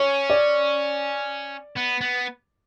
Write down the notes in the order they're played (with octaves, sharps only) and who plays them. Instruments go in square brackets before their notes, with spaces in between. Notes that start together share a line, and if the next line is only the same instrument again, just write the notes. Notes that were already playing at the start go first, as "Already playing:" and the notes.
Already playing: [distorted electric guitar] C#4 [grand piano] C#5
[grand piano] D5
[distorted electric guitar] B3
B3